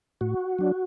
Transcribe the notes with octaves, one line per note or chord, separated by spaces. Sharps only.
A2 F#4
F#3 D4